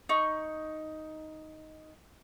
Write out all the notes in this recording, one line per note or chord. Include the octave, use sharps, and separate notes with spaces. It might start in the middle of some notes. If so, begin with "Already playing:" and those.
D#4 C#6